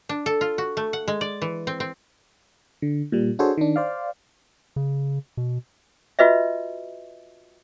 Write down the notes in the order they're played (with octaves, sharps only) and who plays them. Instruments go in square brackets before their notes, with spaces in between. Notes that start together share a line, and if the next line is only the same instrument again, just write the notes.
[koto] D4
A4
F4
F#4
A3
F#5
G#3
D5
E3
C4
C4
[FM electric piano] D3
A#2 G3
D4 F#4 G#4 A4 C5 C#5
D#3 D4
C5 D5 F5
[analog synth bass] C#3
B2
[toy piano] F4 F#4 B4 D#5 E5